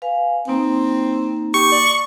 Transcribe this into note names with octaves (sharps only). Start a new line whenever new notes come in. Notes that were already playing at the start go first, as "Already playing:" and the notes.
B4 F5 G#5
A#3 C4 D#4
G4 C#6
D5